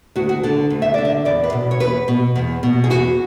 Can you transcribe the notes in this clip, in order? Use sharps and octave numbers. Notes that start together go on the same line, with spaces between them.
D2 F#4
F#4
D3 A4
D2
E5
D3 D5
E5
E2 D5
B4
B2
C#5
E2 B4
B2
E2
B2
G#4
E2 F#4